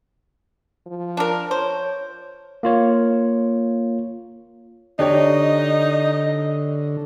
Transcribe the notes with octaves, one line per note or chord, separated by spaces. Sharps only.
F3
D4 A#4
C5 C#5
A#3 F4 C#5
D3 D4 D#4 G4 C#5 D#5